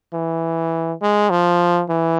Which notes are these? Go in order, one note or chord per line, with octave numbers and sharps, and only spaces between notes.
E3
G#3
F3
E3